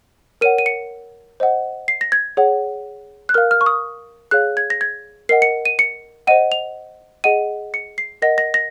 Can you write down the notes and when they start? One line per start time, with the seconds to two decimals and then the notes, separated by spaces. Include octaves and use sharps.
0.41 A#4 C#5 F#5 D#7
0.58 D#7
0.66 C#7
1.40 C5 D#5 F#5
1.88 C7
2.01 A#6
2.12 G#6
2.37 G#4 C#5 F#5
3.29 F#6
3.34 A#4 F5 F6
3.51 F6
3.61 C#6
3.66 D#6
4.31 G#4 C#5 F5 F#6
4.57 G#6
4.70 A#6
4.81 G#6
5.29 A#4 D#5 F#5 C7
5.42 C#7
5.65 D#7
5.79 C#7
6.27 C5 D#5 F#5 D#7
6.52 F7
7.24 G#4 D#5 F#5 D#7
7.74 C#7
7.98 C7
8.22 A#4 D#5 F#5 A#6
8.38 A#6
8.54 A#6